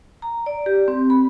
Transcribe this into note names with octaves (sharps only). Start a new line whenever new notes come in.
A#5
D5
G4
C4
B5